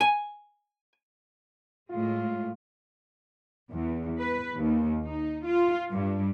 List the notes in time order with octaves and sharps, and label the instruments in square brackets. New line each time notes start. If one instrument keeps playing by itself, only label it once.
[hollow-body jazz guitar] G#5
[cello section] A2 G#3 [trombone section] F4
[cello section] E2
B4
D#2
D#4
F4
G2